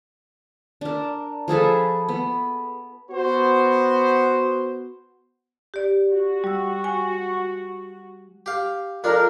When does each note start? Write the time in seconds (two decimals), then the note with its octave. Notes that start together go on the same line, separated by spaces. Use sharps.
0.81 D4 A#4
1.48 F3 G#4 A4 B4
2.09 B3
3.11 B3 F#4 C5
5.74 G4 D5
6.13 F#4
6.44 G3 E6
6.84 G#5 C#6
8.46 G4 F5
9.04 F2 F3 D4 A#4